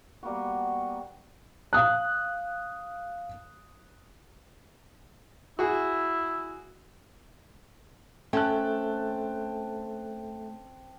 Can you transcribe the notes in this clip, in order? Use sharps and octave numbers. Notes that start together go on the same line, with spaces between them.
G3 A#3 B3 F#4
F5 D#6 F#6
E4 F#4 G#4
A3 C4 C#4 B4 G5 A5 F#6